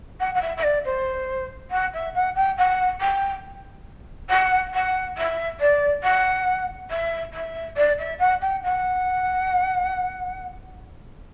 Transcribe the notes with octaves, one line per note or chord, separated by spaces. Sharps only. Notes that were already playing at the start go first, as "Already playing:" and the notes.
F#5
F#5
E5
E5
D5
C5
F#5
E5
F#5
G5
F#5
G5
F#5
F#5
E5
D5
F#5
E5
E5
D5
E5
F#5
G5
F#5